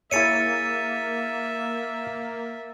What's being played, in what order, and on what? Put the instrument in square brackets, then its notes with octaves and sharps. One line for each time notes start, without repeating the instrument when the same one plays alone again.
[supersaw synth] A#3 [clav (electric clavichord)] E4 G#4 C#5 [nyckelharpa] E5 [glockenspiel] A6 C#7 D#7